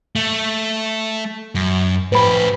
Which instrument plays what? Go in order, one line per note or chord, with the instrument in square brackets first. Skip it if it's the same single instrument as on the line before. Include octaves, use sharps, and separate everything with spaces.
[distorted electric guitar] A3
F#2
[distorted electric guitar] A2 G4 [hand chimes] B4 C5 B5